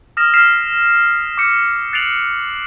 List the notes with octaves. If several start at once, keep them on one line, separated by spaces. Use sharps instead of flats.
D#6 F6 A#6 E7
F6 B6 C7 E7 F7
D6 G6 C#7
F#6 A6 C7 D7 F7 F#7